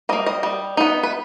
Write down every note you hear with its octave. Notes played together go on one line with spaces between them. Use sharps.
G3 A#3 D#5
D#5
G3
B3 D#4
B4